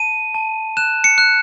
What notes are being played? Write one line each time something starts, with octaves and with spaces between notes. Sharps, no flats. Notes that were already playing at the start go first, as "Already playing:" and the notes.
Already playing: A5 D#7
A5
F#6 E7
C#7
F#6